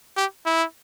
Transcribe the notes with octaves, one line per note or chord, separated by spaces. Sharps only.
G4
E4